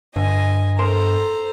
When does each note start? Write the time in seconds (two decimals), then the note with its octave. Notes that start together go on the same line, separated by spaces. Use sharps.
0.16 G2 D3 D#5 G#5
0.79 A4 A#4 C5 A5 A#5 C6